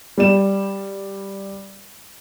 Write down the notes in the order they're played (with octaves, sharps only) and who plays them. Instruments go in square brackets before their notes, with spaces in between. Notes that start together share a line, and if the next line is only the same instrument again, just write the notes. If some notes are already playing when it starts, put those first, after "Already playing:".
[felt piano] G3 D5 E7